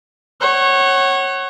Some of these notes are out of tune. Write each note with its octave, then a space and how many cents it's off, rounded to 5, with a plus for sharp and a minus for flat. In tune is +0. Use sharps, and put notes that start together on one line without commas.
C#5 -20 F#5 +25